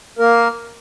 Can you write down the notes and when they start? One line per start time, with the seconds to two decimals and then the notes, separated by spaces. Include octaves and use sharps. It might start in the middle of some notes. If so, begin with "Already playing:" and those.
0.19 A#3 A#4